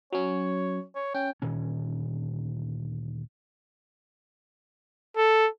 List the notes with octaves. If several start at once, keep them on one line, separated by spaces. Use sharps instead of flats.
F#3 C#4 C#5
C#5
C#4 G5
D2 A#2 D#3 C#4
A4